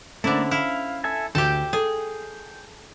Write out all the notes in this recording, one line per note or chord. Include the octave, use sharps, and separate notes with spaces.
D3 A3 A#3 C#4 E4 C5 D5
E4 F5
A4 E5 G#5
D2 G4 A4 G5
G#4 A4